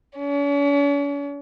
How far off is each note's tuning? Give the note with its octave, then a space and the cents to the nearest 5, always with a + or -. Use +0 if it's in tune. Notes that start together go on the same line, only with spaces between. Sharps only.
C#4 +45